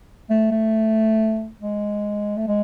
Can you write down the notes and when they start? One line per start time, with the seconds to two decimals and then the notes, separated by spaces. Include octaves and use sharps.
0.30 A3
0.51 A3
1.61 G#3
2.37 A3
2.48 G#3